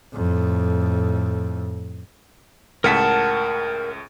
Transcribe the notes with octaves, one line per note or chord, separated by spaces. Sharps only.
F2 A2
C#2 A2 A#4 F#5 A5 B6